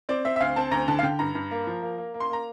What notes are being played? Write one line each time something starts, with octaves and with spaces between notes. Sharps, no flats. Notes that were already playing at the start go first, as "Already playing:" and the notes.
C4 D5
C4 E5
E5
D2 F5
C4 A5
D2 A#5
D3 A5
F5
D3 G5
G2 A#5
G2
A#3
F3
A#3
A#3
A#3
C6
A#3 A#5